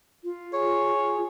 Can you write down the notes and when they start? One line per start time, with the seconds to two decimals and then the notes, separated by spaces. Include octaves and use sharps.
0.24 F4
0.54 G#4 C#5